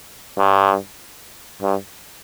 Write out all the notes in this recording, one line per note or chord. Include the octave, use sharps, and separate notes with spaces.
G2
G2